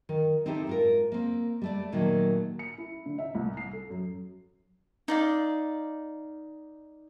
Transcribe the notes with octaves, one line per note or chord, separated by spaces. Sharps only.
D#3
C4 D#4 E4 G4 A4
G#2 F4 A#4
A#3 C4
G3 A3 D5
A#2 D#3 F#3 A3 A#3
C#7
E4
D3
E5
C2
C7
A4
F#2
D#4 D5 F5